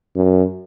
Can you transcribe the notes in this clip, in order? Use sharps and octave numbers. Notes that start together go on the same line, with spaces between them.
F#2